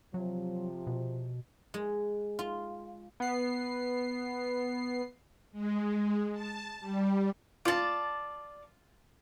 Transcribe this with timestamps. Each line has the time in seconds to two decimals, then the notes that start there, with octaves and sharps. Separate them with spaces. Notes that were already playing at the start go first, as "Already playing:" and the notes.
0.14 C3 F3 F#3
0.87 B2
1.74 G#3
2.39 F4
3.20 B3 C7
5.52 G#3
6.33 A5
6.80 G3
7.65 F4 D5 A5